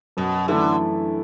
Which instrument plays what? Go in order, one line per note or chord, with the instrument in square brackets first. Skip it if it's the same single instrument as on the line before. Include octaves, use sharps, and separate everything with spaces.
[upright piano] F#2 [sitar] B2
[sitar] D3 [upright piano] E3 A3 E4 A4